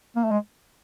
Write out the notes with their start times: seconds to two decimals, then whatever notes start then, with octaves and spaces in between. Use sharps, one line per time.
0.16 A#3
0.24 A3
0.31 G#3